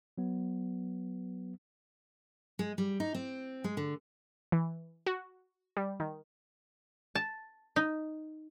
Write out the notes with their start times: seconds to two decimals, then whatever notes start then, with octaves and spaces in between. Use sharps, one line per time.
0.18 F#3 B3
2.59 G#3
2.78 G3
3.00 D#4
3.15 C4
3.64 G#3
3.77 D3
4.52 E3
5.06 F#4
5.77 G3
6.00 D#3
7.15 A5
7.76 D#4